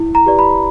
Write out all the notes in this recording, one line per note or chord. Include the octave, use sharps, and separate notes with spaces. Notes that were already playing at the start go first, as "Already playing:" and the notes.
Already playing: E4
A#5
G4 B4 D5
B5